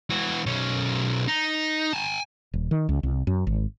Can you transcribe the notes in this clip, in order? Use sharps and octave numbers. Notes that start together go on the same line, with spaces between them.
E3 F#4
B1 C#4
D#4
G#5 A5
D#1
D#3
C#2
C2
F#2
G#1